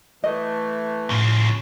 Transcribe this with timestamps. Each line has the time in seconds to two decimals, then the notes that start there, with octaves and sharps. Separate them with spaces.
0.24 E3 A3 D#5
1.10 A2 C#3 F3